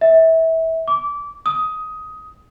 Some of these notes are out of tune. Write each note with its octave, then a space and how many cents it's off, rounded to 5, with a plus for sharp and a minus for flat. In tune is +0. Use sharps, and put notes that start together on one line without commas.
E5 -25
D6 -20
D#6 +15